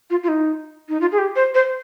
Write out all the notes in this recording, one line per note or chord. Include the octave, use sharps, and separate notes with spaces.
F4
F4
D#4
D#4
F4
G#4
G4
C5
C5